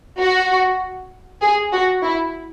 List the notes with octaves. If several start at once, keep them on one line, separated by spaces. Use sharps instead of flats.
F#4
G#4
F#4
E4